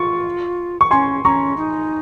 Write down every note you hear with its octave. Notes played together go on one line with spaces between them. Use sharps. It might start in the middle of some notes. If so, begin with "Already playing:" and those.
Already playing: F4 C#6
C#6
C#4 G#5 C6
C#4 A#5 C#6
D#4